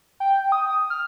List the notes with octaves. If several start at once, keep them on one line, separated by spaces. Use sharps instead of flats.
G5
D#6
F6